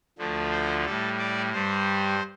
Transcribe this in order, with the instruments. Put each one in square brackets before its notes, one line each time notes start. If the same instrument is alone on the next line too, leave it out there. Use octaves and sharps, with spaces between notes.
[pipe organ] D2 D3 F3 A3
C5
A2 G3 A4
D5
G2 G3 C5